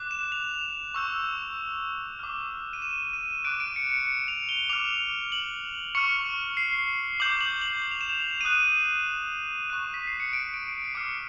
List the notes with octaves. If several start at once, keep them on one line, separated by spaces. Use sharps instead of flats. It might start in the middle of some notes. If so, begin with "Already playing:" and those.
Already playing: D6 F#6
E7
F7
C#6 E6 G6
D6 F6
D#7
E7
D#7
D6 F#6 D7
D7
C#7
C#7
C#7
F7
G7
D6 F6 F7
F#7
C#6 F6 C#7
C7
D6 G6 F#7
F#7
F#7
F#7
F7
E7
F7
D#7
D#6 F#6 E7
C#6 F#6 D#7
B6
C7
C#7
D7
D7
C7
D6 F6 C#7